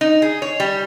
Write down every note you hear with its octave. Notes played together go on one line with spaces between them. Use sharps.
D#4
G#4
C#5
G3